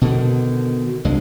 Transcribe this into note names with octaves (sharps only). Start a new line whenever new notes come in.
B2 D3 D#3
C2 G2 G#3